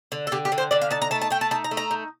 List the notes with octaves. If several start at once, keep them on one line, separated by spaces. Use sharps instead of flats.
D3
A4
D3 G4
G4
D3
C5
D3 D5
F5
D#4 A5
A#5
A3 A5
A5
A3 G5
A5
D#4 A5
A#5
A3
A#5
D#4